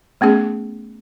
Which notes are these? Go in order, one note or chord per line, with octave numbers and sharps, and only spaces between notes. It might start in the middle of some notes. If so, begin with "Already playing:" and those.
A3 B3 C#4 G#4